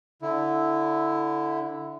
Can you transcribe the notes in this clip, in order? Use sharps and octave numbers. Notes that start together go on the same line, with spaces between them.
D3 E4